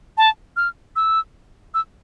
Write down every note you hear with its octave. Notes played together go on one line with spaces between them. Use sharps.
A5
F6
E6
E6